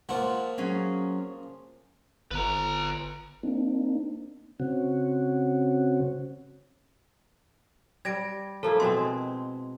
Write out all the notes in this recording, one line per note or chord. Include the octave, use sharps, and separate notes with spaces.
A#2 F3 F#5
F#3 C#4 G#4
G1 B4 A#5
A#3 C4 D4 D#4
C#3 C4 C#4 F#4
G3 G#6 A#6 D7
F3 A#3 E4 A4
B2 G#3 C4 C6